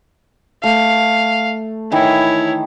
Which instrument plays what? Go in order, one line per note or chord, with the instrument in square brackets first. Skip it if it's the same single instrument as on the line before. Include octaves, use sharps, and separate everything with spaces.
[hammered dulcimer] A3 [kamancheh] F5
[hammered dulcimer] D#3 E3 [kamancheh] E4 C#5